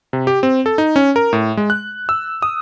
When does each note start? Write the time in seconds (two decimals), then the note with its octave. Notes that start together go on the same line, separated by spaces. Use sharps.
0.13 C3
0.27 G4
0.43 C4
0.66 A4
0.78 D#4
0.96 C#4
1.16 A#4
1.33 A2
1.57 G#3
1.70 F#6
2.09 E6
2.42 D#6